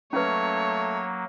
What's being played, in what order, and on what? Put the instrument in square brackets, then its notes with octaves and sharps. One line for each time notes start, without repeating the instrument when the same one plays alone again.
[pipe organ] F#3 A#3 [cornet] A3 [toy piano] C#4 B4 [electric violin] C#5